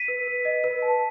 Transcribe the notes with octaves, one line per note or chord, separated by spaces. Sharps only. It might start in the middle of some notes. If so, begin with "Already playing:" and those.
Already playing: B6 D#7
B4
B4
D#5
B4
A5